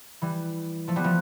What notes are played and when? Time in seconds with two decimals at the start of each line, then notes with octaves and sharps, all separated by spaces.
0.22 E3 G3
0.88 F3 A3
0.96 G3 B3
1.04 F3 A3